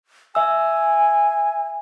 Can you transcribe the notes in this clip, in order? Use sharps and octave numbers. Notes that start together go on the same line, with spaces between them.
E5 G#5 E6